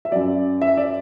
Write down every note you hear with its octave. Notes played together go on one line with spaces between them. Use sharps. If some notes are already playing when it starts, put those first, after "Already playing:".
E5
F#2 F#3 D5
E5
D5